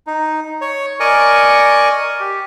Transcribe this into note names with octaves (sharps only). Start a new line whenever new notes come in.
D#4
C#5
A#4 D5 D#5 G#5 C#6
G4